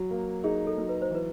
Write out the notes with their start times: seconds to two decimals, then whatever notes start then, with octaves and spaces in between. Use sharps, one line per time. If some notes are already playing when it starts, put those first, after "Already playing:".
Already playing: F#3 F#4
0.11 A#3
0.44 D#4 G#4
0.67 A4
0.78 F#3
0.89 B4
1.02 C5
1.10 E3 B4